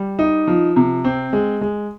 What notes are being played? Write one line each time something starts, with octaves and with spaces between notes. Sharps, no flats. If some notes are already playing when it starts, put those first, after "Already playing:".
Already playing: G3
D#4
F3
C3
C4
G#3
G#3